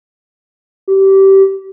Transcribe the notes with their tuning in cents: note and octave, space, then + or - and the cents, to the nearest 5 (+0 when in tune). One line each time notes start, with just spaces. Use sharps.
G4 -20